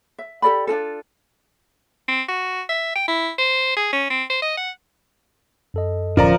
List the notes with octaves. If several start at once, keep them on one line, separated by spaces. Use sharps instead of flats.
E5
G4 A4 D5 B5
D4 D#4 F4 A4
C4
F#4
E5
G5
E4
C5
G#4
C#4
C4
C5
D#5
F#5
F#2 A4 D#5
D1 F3 C#4 A#4 D5 A#5